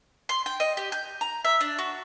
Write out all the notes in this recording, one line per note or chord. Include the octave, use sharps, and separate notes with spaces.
C6
G5
D#5
G4
G6
A#5
E5
D4
F#4